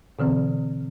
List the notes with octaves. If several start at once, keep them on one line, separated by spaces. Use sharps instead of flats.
B2 D3 E3 C4